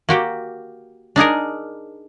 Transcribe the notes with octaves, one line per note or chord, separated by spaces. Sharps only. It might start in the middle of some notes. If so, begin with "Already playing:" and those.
A#3 F#4 G4
D4 D#4 G#4 A#4